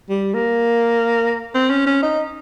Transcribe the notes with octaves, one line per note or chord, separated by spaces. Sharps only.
G3
A#3
C4
C#4
C#4
D#4